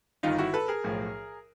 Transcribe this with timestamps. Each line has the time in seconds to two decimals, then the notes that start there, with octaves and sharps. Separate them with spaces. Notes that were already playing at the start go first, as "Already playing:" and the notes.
0.23 G1 G2 D#3 D#4 F4
0.38 E4 F#4
0.54 A4 B4
0.68 G#4 A#4
0.84 B1 A2 F3